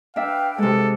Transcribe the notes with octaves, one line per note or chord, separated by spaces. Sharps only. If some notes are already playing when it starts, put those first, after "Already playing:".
D4 B4 E5 F5 G5
C3 G#3 A4